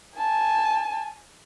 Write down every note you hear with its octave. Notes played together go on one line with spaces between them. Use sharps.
G#5 A5